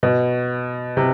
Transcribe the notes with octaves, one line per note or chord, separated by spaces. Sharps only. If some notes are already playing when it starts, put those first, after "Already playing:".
B2
C3